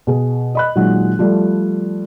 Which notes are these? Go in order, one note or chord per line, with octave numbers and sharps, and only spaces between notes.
B2 G#4
D#5 B5 F#6
A#2 D#3 F#3 G#3
F3 G3 A3